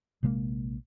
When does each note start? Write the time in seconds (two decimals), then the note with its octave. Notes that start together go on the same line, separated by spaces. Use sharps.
0.23 A#1 C3 G#3 A#3